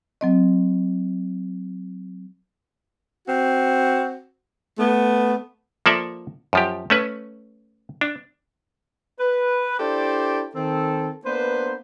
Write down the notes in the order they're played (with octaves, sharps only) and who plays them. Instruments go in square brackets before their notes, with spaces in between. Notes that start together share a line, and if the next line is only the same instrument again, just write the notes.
[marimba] F#3 C4 D#5
[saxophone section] C4 F#4
A3 B3
[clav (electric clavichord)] F3 A#3 A4 D5 E5
F#2 F3 G4
A3 C#4 B4
D4
[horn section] B4
D4 E4 G4 A4 C5 D5
D#3 C4 A4
A#3 B3 D4 B4 C5